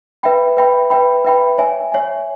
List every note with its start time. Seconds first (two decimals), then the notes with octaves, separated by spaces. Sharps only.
0.23 B4 E5 G5 B5
0.57 B4 E5 G5 B5
0.90 B4 E5 G5 B5
1.25 B4 E5 G5 B5
1.58 C#5 E5 G#5
1.92 C#5 E5 G#5